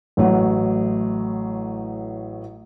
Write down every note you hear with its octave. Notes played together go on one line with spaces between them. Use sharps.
A1 A2 F#3